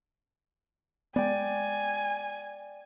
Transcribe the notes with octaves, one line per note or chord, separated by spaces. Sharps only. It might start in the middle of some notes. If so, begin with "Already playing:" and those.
G#3 B3 D5 G5 G#5